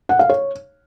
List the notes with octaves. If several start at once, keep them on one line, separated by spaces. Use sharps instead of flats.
F#5
F5
C#5